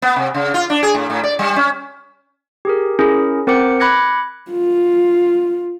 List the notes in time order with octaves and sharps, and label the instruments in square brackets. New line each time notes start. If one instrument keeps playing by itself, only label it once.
[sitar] B3
C3
C#3
F4
D4
G#4
A2
A2
D5
G3
C#4
[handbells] G4 G#4 A#4
C#4 E4 G#4 A#4
C4 A#4 C5 F#5 D6 C#7
B5 D6 F#6 G#6 A#6 C#7
[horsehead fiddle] F4